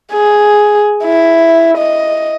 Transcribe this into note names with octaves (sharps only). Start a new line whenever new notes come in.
G#4
E4
D#5